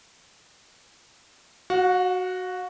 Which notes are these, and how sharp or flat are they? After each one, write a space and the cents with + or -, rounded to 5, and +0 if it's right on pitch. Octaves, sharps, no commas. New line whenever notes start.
F#4 +0 F#5 -45